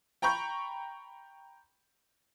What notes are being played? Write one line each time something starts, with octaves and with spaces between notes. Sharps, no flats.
G5 A#5 B5 C#6 G6